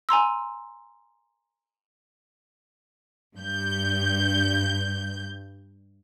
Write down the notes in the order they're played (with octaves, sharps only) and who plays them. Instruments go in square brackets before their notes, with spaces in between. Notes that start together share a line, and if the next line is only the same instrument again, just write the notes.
[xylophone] G#5 A#5 C6 E6
[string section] G2 G6